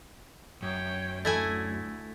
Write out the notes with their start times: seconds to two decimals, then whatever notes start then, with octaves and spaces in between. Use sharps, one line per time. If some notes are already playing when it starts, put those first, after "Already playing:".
0.62 F#2 C#5 G5
1.25 D2 A3 E4 G#5